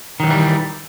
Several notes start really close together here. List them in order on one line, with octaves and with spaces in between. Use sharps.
D#3 F#3 E3 G3